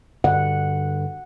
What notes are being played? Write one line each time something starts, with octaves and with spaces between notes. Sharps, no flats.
G2 D3 F#5